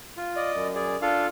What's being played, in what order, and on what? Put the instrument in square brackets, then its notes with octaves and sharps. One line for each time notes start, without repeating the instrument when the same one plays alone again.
[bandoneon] F4
[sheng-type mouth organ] D5 D#5
[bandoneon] F#2
[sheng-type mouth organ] G#4 D5
[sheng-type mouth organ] D4 [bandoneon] F4 A4 F5